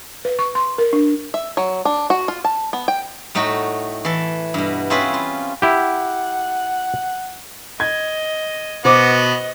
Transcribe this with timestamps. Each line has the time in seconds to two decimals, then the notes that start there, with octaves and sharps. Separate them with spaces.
0.25 B4
0.39 C#6
0.55 C6
0.78 A#4
0.93 D4
1.34 E5
1.57 F#3
1.85 D4
2.10 F#4
2.28 F4
2.44 A5
2.73 B3
2.88 G5
3.35 A2 A3 D#4 F#4 G5
4.05 E3 A4
4.54 G2 B2
4.90 C4 C#4 E4 F4 G#4 B4
5.14 F4
5.62 E4 G4 F#5
7.80 D#5 G#6
8.85 B2 B3 F#4 C5 D#5 D6